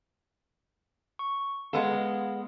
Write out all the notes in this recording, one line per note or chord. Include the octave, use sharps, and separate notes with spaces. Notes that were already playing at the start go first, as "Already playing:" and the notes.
C#6
G#3 B3 A4 D#5 F5